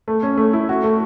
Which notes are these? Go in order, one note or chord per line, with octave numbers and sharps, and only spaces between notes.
A3
C#4
A3
E4
F#4
A3